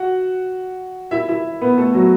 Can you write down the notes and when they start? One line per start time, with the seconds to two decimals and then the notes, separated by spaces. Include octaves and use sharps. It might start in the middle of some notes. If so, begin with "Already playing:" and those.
Already playing: F#4 F#5
1.11 E4 E5
1.28 E4 E5
1.61 B3 B4
1.77 A3 A4
1.94 F#3 F#4